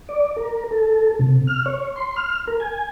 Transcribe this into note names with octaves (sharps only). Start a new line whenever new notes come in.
D5
A#4
A4
C3
F6
C#5
C6
F6
A#4
G#5